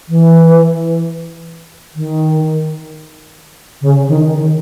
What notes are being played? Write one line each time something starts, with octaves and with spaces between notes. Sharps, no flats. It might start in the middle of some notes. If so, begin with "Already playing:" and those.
E3
D#3
C#3
D#3
D#3